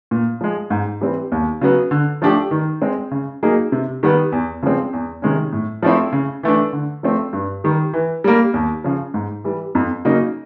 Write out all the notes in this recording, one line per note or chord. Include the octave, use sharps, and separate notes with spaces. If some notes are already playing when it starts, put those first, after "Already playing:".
A#2
F3 G#3
G#2
E3 G3 C4
D#2
C#3 F#3 B3
D3
F3 A3 D4 G4
D#3
G#3 C4
C#3
F#3 A#3 D#4 G#4
C3
D#3 G3 B3
E2
C#3 F3 G#3 C4
E2
C3 D#3 G#3 C#4
A2
F3 A3 C4 E4
C#3
E3 A3 D4
D3
F3 A3 C4
G2
D#3 G3
E3
G3 A#3
D#2
C#3 F3
G#2
E3 G3
F2
C#3 F#3 A#3 D#4